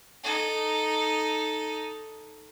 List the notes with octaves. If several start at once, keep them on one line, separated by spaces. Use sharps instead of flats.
D#4 A4